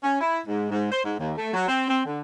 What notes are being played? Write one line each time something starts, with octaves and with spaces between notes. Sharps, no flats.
C#4
E4
G#2
G#2
C5
G#2
D#2
A3
F#3
C4
C4
D3